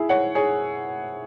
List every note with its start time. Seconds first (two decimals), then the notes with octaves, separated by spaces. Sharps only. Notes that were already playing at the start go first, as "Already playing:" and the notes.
Already playing: E4 G#4
0.09 C#5 F#5
0.35 G#4 C#5